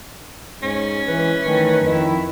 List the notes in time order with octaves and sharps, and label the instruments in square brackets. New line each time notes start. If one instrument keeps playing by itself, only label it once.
[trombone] G#2 [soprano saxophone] C#4
[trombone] E3 [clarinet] B4
[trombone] D#3 [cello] E3 A3
[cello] F2 E4 [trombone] D#3